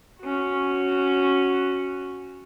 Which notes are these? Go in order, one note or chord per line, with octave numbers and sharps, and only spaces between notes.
C#4 F#4